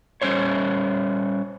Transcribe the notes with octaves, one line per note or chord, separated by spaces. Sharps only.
G3 C#4 C5 C#5